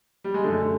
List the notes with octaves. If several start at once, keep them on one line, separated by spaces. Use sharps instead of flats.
G3
G#3
F#2 D3 A3